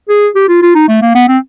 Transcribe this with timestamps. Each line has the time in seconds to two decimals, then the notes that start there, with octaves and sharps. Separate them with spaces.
0.09 G#4
0.35 G4
0.48 F4
0.62 F4
0.75 D#4
0.89 A3
1.02 A#3
1.15 B3
1.29 C4